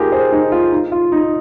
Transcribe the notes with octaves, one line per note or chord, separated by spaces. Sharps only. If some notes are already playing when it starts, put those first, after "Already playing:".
Already playing: D#4 F4 G4 G#4 A#4
G#4 C5
D#4
F4
D#4
F4
D#4